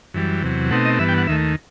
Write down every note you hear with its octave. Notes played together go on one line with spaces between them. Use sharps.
F#2 E3 G3
E2 C3 F#3
B2 A3 C4 D#4 F#5
D#5
G2 E3 B3 E5
G5
F#5
D#2 D#3 A3 E5